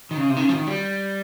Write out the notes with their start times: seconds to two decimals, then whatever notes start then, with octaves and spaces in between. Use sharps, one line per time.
0.11 D#3
0.17 C#3
0.30 C3
0.37 D#3
0.42 C#3
0.49 F3
0.54 D#3
0.67 G3